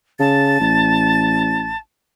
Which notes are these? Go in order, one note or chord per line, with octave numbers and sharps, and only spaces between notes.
C#3 A5 A6
A1